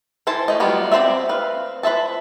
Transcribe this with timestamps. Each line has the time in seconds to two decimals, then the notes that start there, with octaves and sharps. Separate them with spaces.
0.27 E3 C5 G#5 A5
0.48 A3 D#5
0.60 F#3 G3 B3 F4
0.92 C4 D#4 C5 D5 E5
1.29 B4 F5
1.83 B4 C5 E5 A5